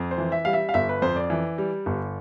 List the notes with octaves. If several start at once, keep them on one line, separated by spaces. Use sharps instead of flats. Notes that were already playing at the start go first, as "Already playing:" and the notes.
Already playing: F2
C5
E3
E5
G3 F5
E5
F5
G1 E5
B4
F2 C5
D5
E3
G3
G1